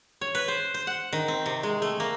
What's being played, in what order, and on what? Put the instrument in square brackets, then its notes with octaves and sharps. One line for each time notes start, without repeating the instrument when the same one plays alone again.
[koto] C#5
B4
C5
C5
F#5
D#3
C4
C3
G#3
A3
A#3